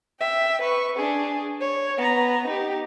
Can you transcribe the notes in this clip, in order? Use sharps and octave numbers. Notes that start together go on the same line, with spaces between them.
E5 G5
B4 C#6
D4 G#4
C#5
B3 A#5
D#4 G4